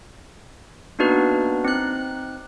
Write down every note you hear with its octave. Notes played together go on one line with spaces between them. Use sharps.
A#3 B3 D4 D#4 F#4 B4
C4 D#4 F#6